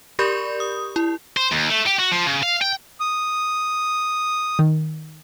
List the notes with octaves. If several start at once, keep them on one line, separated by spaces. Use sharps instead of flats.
G4 A#4 D5 B5 C#6 G6
D#6
E4
C5
D#2
A3
G4
F#4
F3
C#3
F5
G5
D#6
D#3